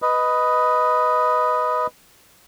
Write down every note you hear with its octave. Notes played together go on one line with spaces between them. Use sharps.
B4 D#5